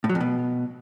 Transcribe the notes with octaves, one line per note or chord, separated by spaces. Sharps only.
A2
F#3
F2
B2